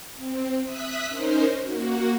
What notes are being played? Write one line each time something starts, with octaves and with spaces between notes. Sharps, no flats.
C4
E5 D#6 F#6 B6
C#4 D#4 A#4 C5
A#3 F#4